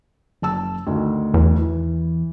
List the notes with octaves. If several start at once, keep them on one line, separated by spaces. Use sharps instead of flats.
F#1 A5 E6
D2 D#3
E2
E3